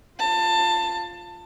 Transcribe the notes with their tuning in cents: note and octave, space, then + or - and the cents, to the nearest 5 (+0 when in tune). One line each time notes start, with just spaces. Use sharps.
F4 +0 A5 +20